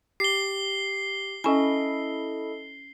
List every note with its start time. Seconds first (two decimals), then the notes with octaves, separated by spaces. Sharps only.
0.20 G4 C7 G7
1.44 C#4 E4 A4 D#5 G#5